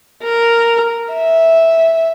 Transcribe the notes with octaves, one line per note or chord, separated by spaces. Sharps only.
A#4
E5